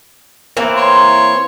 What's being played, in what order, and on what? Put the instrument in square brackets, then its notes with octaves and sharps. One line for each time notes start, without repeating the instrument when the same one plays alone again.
[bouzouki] E3 A#3 C4
[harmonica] C#5 C6